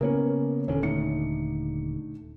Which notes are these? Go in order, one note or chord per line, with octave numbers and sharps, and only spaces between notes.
C#3 A#3 B3 C#4 A#4
D#1 D#2 D3 C#4 A4
A3 D#4 C#7